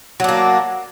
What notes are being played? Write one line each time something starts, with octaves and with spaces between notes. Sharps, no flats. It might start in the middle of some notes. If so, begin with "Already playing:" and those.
F#3 A#3 D4